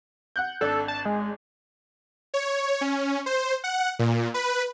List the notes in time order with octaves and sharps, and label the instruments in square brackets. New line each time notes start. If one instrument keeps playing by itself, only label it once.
[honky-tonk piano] F#5 F#6 G6
[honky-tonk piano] G#1 D4 [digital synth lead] A4
[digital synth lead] A5
G#3
[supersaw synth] C#5
C#4
C5
F#5
A#2
B4